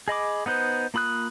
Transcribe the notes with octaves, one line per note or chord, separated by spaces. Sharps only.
G#4 D#5 B5 D6
B3 D#4 B4 C5
A#3 F4 B5 D#6 F#6